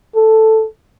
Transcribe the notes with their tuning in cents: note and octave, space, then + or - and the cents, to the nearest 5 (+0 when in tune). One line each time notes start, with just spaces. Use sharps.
A4 +5